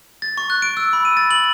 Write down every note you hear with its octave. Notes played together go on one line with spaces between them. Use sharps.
A6
C#6
F#6
D7
E6
B5
D#7
A6
F#7